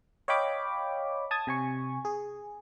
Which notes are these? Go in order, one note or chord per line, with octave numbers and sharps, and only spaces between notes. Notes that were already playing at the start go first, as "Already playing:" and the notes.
C#5 D#5 F5 G5 B5 D6
A5 D#6 G#6
C3 G#5 C#6
G#4